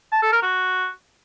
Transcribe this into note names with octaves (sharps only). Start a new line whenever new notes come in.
A5
A4
A#4
F#4